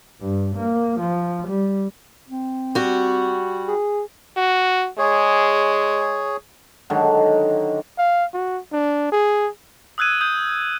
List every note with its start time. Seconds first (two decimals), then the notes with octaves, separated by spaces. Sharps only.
0.21 G2
0.56 A#3
1.00 F3
1.48 G3
2.29 C4
2.75 G3 F#4
3.68 G#4
4.36 F#4
4.98 G#3 G#4 C#5
6.90 D3 D#3 F#3 G#3
7.98 F5
8.33 F#4
8.72 D4
9.12 G#4
9.98 D#6 E6 F#6 G#6 D#7
10.21 D#6 G6